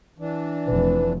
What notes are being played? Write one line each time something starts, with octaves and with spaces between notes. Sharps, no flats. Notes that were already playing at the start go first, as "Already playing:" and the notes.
E3 D4
F1 B4